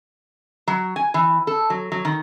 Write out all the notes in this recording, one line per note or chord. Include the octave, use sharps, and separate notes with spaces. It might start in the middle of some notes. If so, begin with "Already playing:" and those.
F#3
G#5
E3
A4
F#3
F#3
D#3